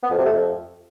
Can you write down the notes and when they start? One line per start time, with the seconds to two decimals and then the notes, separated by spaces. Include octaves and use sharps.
0.03 B3
0.11 F2
0.18 C3
0.26 A3
0.33 F2